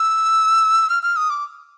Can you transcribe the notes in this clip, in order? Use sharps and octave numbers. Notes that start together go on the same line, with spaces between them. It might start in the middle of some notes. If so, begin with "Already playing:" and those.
Already playing: E6
F6
F6
D#6
D6